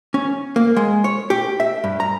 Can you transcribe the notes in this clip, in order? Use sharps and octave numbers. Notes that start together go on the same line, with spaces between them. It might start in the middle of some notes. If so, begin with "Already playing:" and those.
C#4
A#3
G#3
C#5
G4
E5
G2
A#5